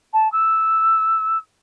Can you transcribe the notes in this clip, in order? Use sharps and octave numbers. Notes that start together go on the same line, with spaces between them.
A5
E6